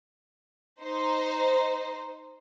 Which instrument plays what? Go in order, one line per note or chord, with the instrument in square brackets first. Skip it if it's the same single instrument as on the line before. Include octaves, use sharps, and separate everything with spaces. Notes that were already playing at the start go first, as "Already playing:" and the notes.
[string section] D#4 C5